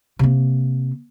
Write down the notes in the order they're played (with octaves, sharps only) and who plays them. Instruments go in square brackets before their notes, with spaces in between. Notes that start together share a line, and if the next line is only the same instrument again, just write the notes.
[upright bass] C3 A#3